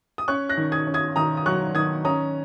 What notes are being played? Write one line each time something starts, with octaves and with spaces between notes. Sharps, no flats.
D#6
C#4 C#6 F#6
F#6 A#6
D#3
D#6 G#6
C#4
D#6 G#6
D#3 A#5 D#6
D#6
F#3 C#6 F#6
D#3 D#6 G#6
C#4 A#5 D#6